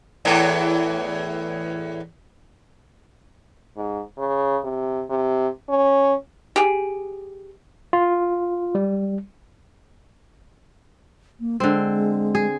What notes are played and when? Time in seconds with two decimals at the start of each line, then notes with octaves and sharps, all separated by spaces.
0.25 E2 A2 E3
3.77 G#2
4.18 C#3
4.64 C3
5.09 C3
5.69 C#4
6.56 G4 G#4
7.93 F4
8.75 G3
11.40 A#3
11.60 D3 G#3 C4
12.35 G#4